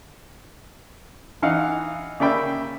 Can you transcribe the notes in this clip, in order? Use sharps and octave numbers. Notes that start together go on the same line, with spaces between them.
E3 D#4 F5 F#5
C#3 A#3 D5 E5 G5 B5